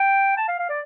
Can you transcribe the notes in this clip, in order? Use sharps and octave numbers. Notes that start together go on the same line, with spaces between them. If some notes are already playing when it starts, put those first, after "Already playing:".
Already playing: G5
A5
F5
F5
D5